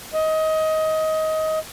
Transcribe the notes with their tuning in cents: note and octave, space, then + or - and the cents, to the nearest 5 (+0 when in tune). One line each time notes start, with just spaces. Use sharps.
D#5 +20